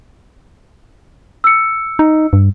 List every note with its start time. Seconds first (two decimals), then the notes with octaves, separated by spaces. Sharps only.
1.44 E6 C#7
1.99 D#4
2.33 G2